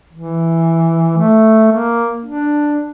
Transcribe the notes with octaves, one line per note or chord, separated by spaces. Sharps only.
E3
A3
A#3
D4